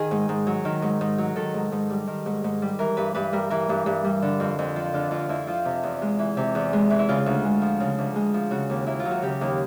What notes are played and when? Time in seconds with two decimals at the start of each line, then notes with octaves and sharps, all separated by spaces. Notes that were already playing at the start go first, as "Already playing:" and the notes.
Already playing: D#3 G#4
0.11 G#2
0.29 G#2
0.47 F#3
0.65 D#3
0.82 G#2
1.01 G#2
1.18 F#3
1.36 D#3 A4
1.54 G#2
1.72 G#2
1.90 G3
2.07 D#3
2.26 G#2
2.44 G#2
2.62 G3
2.79 E3 A#4
2.97 G2 B4
3.15 G2 B4
3.33 G3 A#4
3.50 E3 A#4
3.69 G2
3.86 G2
4.05 G3
4.22 D3
4.40 F2
4.59 F2
4.76 F3
4.94 D3 F4
5.11 F2 F4
5.29 F2 E4
5.47 F3 F4
5.65 C3
5.83 E2
6.02 G#3
6.19 E3
6.37 C3
6.55 E2
6.73 G#3
6.90 E3
6.99 E4
7.09 C#3 F4
7.26 D2
7.45 G#3
7.62 F3
7.80 C#3
7.99 D2
8.16 G#3
8.34 F3
8.51 C#3 F#4
8.70 D#2
8.86 D#2 E4
9.00 F4
9.05 F#3
9.11 F#4
9.22 C#3 G4
9.41 D#2